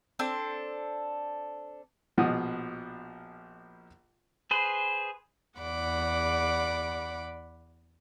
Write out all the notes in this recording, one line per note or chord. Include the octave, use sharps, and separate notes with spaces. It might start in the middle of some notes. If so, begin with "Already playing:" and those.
C4 D4 A4 C6
A#1 B2 F3 D#5 F#5 D#6
G#4 B4 C5
E2 D5 F#5 B5 D6